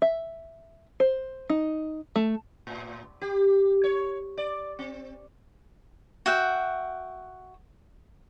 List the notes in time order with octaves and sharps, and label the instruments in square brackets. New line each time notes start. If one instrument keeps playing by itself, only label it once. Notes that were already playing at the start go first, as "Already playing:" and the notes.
[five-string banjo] E5
C5
D#4
A3
[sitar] A2
G4
C#5
D5
C4
[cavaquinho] F#4 E5 F#5 G5